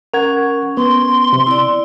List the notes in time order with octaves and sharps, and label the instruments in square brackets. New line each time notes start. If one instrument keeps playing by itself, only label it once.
[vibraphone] C#4 [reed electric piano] A#4 F#5 G#6
[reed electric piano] B3 [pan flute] C6
[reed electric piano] C3
[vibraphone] E4 D5